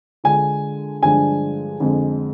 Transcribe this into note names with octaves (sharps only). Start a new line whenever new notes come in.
D3 G#3 D4 F4 G#5
G2 D3 F3 G#3 D4 G#5
F2 D3 G#3